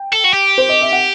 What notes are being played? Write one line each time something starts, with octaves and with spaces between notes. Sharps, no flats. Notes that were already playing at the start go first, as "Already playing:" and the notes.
Already playing: G5
A4
F#4
G4
C5
D#5
E5
F#5